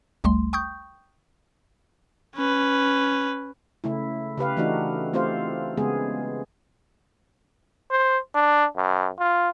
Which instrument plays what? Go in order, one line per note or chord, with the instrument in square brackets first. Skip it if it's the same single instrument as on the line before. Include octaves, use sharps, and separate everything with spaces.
[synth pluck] G#1 D2 G3 A3 C6
G5 C#6 D#6 G6
[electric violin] C#4 B4
[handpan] C#3 A3 E4
C#3 G4 B4 F5
E3 A3 D4 D#4 F#4
A3 C4 F4 G4 C5 F5
C#3 G#3 B3 G#4
[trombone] C5
D4
F#2
F4